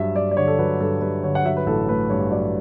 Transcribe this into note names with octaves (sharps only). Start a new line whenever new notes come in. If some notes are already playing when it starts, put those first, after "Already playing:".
Already playing: G2 F#3 E5
G2 D5
D5
D3 C#5
A4
F#3 B4
G2 A4
G2 B4
D3 C#5
F#5
F#3 E5
B4
A1 A4
A3 B4
G2 C#5
F#3 D5